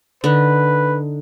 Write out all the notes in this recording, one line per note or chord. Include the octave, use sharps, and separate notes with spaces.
D3 D#4 B4